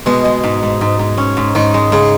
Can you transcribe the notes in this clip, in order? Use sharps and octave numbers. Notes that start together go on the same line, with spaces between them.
B2 G#3
G#3
G#2
G#2
G#2
G#2
C#4
G#2
G#2 D#3
G#3
G#2 C#3